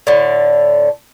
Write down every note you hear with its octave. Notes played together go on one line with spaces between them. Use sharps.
A2 D3